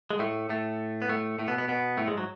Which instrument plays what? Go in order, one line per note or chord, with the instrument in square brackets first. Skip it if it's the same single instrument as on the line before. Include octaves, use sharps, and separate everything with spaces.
[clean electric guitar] G#3
A2 A3
A2 A3
B3
A2 A3
A2 A3
B2 B3
B2 B3
B2 B3
A2 A3
G#2 G#3
F#3